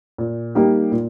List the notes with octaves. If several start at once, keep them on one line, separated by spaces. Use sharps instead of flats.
A#2
G3 A#3 D#4 G4
A#2